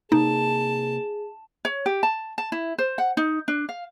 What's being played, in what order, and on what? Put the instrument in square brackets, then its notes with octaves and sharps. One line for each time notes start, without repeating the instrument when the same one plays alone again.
[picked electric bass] C3 A#3 [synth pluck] D#4 [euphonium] G#4 [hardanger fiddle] A5
[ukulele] C#5
G4
A5
A5
E4
C5
F#5
D#4
D4
F5